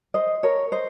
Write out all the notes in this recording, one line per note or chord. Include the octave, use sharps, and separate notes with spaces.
C5 D#5
A#4 C#5
C5 D#5